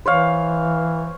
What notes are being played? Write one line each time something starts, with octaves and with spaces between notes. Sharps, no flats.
E3 C5 C#5 F5